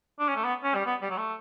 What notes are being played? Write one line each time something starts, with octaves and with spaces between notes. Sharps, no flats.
D4
C#4
A3
B3
C#4
G3
B3
G3
F#3
A3